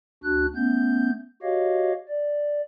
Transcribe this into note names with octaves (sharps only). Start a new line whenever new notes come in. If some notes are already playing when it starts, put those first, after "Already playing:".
D2 D4 F#4 F#6
A3 B3 C#4 G6
F#4 G4 C#5 D#5 F5
D5